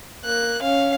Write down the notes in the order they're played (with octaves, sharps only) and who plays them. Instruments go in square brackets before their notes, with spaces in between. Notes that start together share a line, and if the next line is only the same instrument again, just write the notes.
[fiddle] A#3 F#6
C#4 F5